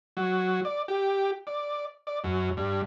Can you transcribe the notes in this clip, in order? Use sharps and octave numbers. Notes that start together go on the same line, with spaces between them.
F#3
D5
G4
D5
D5
F#2
G2